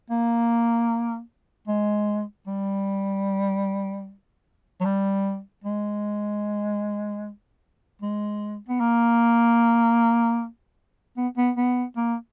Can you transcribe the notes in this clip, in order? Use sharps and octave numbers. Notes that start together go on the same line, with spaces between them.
A#3
G#3
G3
F#3
G3
G#3
G#3
B3
A#3
B3
B3
B3
A#3